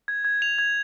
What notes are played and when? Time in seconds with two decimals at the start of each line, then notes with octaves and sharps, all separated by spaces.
0.08 G#6
0.25 G#6
0.42 F7
0.58 G#6